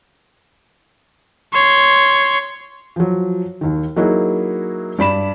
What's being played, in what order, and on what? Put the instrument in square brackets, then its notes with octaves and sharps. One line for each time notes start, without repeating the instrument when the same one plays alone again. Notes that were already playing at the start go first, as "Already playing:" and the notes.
[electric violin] C#5 C6
[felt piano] F3 F#3
D#2 D#3
F#3 A#3 D#4 E4 F#4 G#4
G2 D5 B5 E7